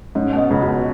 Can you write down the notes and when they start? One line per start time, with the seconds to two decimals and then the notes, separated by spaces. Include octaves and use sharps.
0.15 G#2 C#4
0.33 B2
0.38 D#5
0.50 C#2 C#3
0.63 F#4
0.68 B2